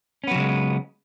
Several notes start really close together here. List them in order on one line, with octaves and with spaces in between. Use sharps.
C#4 B3 F#3 C#3 G#3